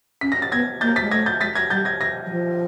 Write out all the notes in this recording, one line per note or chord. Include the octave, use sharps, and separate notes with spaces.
C#4 B6
A#6
A6
B3 G#6 A#6
A#3 G6 A6
A6 B6
G#3
A3 G#6 A#6
G6 A6
G#3 A6 B6
G#6 A#6
G3 G6 A6
G#6 A#6
G#6 A#6
F#3
F3